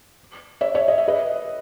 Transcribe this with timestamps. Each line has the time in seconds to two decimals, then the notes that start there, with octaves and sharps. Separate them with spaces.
0.61 C#5 E5
0.75 C#5 E5
0.88 D#5
0.98 E5
1.08 B4 D#5